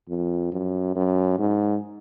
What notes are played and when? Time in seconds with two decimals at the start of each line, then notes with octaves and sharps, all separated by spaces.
0.09 F2
0.52 F#2
0.96 F#2
1.39 G#2